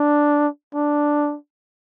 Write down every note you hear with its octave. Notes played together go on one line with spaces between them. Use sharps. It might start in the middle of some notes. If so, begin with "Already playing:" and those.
Already playing: D4
D4